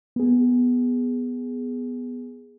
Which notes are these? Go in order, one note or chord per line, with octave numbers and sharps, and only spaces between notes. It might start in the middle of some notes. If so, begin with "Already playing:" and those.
B3 G#4